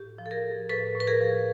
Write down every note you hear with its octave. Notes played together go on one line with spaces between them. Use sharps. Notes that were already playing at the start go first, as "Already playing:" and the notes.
Already playing: A2 G4
F3
A4
G#4 A#4
F3
A2 A4 B4
A2
B4
G#4 A#4
F3